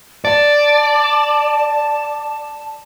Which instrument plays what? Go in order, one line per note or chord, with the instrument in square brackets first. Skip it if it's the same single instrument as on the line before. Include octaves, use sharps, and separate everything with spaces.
[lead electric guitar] D5 [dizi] A5